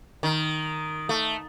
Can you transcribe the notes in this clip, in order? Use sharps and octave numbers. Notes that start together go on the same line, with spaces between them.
D#3
A3